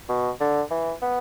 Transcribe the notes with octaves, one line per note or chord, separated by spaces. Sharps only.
B2
D3
E3
B3